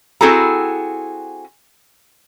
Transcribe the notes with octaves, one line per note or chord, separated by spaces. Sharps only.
C4 E4 F#4 G#4 A4 A#5